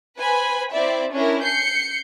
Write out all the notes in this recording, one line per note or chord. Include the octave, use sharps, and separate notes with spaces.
B4 C5 G#5 B5
C4 E4 D5 E5
C#4 D4 E4 A#4
G6 C7 C#7